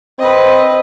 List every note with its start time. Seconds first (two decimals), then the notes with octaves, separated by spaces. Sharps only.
0.19 C4 B4 D#5